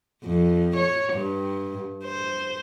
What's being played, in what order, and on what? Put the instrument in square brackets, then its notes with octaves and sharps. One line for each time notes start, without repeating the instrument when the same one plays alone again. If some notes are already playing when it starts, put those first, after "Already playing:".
[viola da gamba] F2
C#5
G2
C5